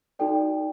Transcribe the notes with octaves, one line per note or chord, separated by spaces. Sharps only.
D#4 F#4 A4 D5 G5